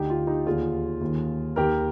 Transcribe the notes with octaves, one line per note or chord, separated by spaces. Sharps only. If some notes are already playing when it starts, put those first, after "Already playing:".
Already playing: D2 D3 D#4 G4
F4
D#4 G4
D#2 D3 F4 G#4
D#2 D#3
D#2 D#3 G4 A#4